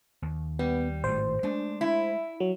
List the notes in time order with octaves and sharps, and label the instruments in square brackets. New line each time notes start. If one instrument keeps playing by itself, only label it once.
[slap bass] D#2
[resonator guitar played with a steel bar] G3 [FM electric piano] B3
[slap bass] G#1 A2 A3 [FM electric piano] C5
[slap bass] G#3 A3 [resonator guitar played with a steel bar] D4
[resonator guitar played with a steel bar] E4
[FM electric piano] F#3